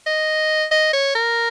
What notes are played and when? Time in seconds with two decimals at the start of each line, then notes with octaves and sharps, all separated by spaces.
0.06 D#5
0.71 D#5
0.93 C#5
1.15 A#4